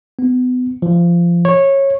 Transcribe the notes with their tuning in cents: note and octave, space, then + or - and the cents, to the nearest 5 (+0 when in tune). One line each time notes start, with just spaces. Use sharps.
B3 +30
F3 -20
C#5 -15